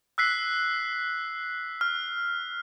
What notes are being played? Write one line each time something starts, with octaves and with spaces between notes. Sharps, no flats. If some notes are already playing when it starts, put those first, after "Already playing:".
E6 F#6 B6 C7
F6